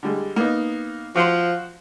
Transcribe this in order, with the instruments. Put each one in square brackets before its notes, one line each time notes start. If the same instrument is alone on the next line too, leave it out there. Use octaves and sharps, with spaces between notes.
[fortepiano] D3 G3 G#3
A#3 B3 D#4
[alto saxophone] F3 [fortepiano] F#4 C5